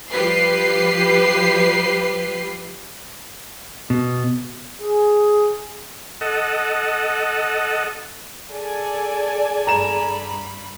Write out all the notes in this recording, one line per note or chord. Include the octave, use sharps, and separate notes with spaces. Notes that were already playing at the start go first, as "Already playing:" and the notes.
F3 G3 G4 B4 C7
B2
G#4
A4 D#5 F#5
G#4 A4 D5 G#5
G2 A#5 B5 E7